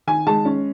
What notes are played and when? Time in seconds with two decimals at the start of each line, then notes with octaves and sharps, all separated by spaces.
0.07 D#3 G#5
0.27 G#3 A5
0.45 C#4